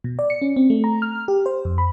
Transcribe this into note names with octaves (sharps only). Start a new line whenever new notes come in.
B2
D5
C#7
C#4
C4
A3
A#5
F6
G4
C5
F2
B5